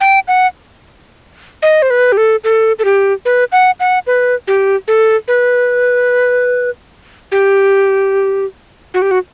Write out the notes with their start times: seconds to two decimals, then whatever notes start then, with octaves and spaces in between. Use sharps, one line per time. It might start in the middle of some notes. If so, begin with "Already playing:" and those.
0.01 G5
0.28 F#5
1.62 D#5
1.82 C5
1.90 B4
2.12 G4
2.17 A4
2.44 A4
2.79 A4
2.85 G4
3.25 B4
3.52 F#5
3.80 F#5
4.07 B4
4.48 G4
4.88 A4
5.28 B4
7.32 G4
8.94 F#4
9.02 G4
9.11 F#4